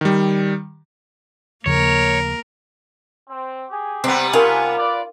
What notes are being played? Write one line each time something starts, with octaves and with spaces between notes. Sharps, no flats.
D#3 G3
D#2 C#3 F3 A#3 A#4 C#5
C4
G4 G#4
C3 G3 B3 C4
D4 D#4 F4 G4 A#4 G#5
B4 D5